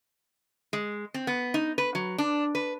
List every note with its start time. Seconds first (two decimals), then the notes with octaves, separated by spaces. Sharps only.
0.73 G#3
1.14 C4
1.27 B3
1.54 D#4
1.78 B4
1.95 F#3
2.18 D4
2.55 B4